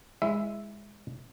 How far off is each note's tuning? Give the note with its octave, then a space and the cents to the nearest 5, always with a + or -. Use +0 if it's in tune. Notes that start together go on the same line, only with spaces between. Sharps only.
G#3 -10 E4 +0 E5 +0